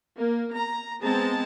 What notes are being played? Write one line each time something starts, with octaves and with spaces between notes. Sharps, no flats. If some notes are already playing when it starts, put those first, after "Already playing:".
A#3
A#5
G#3 B3 C4 A5 A#5